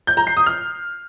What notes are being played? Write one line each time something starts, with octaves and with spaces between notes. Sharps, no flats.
G6
A#5
C7
D#6
F6